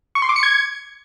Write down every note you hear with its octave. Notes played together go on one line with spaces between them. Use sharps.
C#6
C6
D6
C#7
G#6